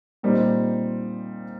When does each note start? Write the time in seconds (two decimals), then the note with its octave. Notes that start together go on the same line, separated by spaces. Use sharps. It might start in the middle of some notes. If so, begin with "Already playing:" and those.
0.23 A#2 G3 C4 D#4